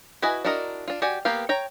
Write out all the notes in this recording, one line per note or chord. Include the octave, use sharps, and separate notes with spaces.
E4 F#4 B4 D#5 G#5
D4 E4 F#4 A#4 D#5
D4 F4
F#4 G4 D5 G#5
A#3 B3 G4 F5
C#5 G5 A#5